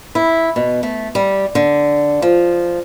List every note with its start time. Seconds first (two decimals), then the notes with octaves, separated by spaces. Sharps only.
0.15 E4
0.56 B2
0.83 A3
1.15 G3
1.55 D3
2.22 F3